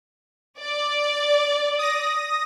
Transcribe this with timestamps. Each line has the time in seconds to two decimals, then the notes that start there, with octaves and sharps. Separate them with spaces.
0.61 D5
1.79 D#6 A#6